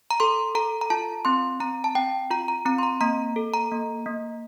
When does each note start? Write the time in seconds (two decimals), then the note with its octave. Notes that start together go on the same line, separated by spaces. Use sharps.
0.11 A#5
0.20 A4 C6
0.55 A4 A#5
0.81 A#5
0.90 F4 A5
1.25 C4 C6
1.60 C4 A#5
1.84 A5
1.95 C4 G5
2.31 F4 A#5
2.48 A#5
2.66 C4 A#5
2.78 C6
2.83 A#5
3.01 A#3 A#5
3.36 A4
3.54 A#5
3.71 A#3
4.06 A#3